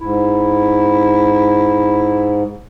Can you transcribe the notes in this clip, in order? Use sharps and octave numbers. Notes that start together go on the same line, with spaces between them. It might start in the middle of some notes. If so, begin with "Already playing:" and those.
G#2 E4